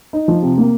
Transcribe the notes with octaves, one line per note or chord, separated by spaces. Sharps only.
D#4
F3
C3
A#3